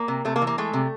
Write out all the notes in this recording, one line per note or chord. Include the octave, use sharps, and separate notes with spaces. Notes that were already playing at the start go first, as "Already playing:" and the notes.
Already playing: A#3
C3
C3 A3
A#3
E3
A#3
G#3 A3
C3